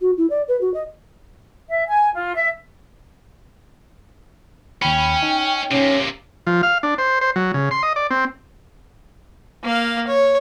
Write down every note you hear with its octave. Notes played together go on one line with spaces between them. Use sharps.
F#4
E4
D5
B4
F#4
D#5
E5
G#5
F4
E5
D#2 C#4 G5 B5
D#4
C3 A#3 C#4
F3
F5
D4
C5
C5
F#3
C#3
C6
D#5
D5
C4
A#3 F5
C#5